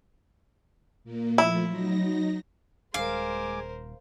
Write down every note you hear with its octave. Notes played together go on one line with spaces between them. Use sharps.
A#2 A#3
F3 A3 E4 F4
F#3 D#4 A#6
D#1 G#3 A#4 C5 F5 G#5 D6